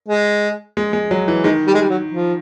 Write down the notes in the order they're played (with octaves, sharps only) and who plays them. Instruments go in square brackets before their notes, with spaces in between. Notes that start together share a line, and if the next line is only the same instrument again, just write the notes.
[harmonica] G#3
[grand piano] G#3
G#3
F#3
E3
[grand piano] D#3 [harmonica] G#3
[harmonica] G3
G#3
G3
F#3
F3